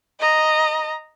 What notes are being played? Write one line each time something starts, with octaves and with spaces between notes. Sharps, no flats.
D#5 A#5